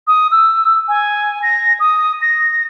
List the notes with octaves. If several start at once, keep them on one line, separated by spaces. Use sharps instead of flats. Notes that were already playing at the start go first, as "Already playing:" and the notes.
D#6
E6
G#5
A#6
D#6
A#6